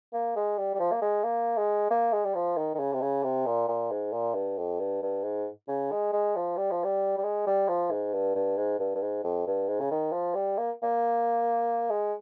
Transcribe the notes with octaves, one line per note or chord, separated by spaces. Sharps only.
A#3
G#3
G3
G3
F3
A#3
G#3
A#3
G#3
A#3
G#3
G3
F3
D#3
D#3
C#3
C3
C#3
C3
A#2
A#2
G#2
A#2
G2
F2
G2
G2
G#2
C#3
G#3
G#3
F3
G3
F3
G3
G3
G#3
G3
F3
G#2
G2
G2
G#2
G2
G2
G#2
F2
G2
G#2
C#3
D#3
F3
G3
A#3
A#3
G#3